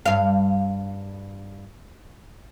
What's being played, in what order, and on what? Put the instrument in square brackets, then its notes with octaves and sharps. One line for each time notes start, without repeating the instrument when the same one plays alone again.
[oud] G2 F5